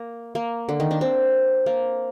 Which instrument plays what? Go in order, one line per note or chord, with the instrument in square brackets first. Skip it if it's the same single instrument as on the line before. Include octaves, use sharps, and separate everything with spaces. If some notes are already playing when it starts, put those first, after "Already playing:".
Already playing: [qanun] A#3
A#3
D3
D#3
D4
C4
A#3